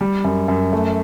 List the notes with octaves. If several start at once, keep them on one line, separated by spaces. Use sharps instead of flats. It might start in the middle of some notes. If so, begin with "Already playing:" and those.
G3
F#2
F#2
A3